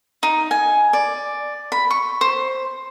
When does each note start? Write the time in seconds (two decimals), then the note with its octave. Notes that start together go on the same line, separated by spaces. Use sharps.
0.23 D#4
0.51 G#5
0.93 D5
1.72 B5
1.91 C#6
2.21 C5